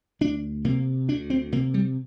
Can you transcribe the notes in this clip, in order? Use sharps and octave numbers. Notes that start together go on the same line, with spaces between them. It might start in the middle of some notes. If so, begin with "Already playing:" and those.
D2 D4
C3 A#3
D2 D4
C4
C3 A#3
G3